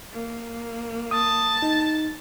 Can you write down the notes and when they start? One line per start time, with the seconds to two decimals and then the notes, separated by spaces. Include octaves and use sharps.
0.13 A#3
1.11 A5 D#6
1.62 D#4